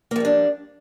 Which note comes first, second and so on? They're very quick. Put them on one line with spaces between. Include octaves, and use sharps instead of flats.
A#3 F3 G3 D4